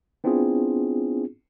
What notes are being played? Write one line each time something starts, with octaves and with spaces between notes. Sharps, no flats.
B3 C4 D4 E4 F4 G#4